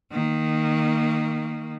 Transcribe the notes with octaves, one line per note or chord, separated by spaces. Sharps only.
D#3 A#3